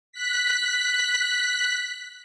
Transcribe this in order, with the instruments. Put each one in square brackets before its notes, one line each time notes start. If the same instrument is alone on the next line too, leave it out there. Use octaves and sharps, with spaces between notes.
[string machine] F#6 B6